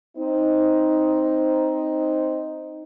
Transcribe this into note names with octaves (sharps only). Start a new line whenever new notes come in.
C4 D#4